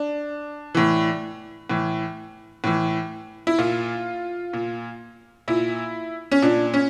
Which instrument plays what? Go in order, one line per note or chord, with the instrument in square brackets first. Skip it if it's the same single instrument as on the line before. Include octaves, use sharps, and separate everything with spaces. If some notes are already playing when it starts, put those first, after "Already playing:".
Already playing: [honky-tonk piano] D4
A2 E3
A2 E3
A2 E3
E4
A#2 F4
A#2
A#2 E4
C#4
A#2 D4
C#4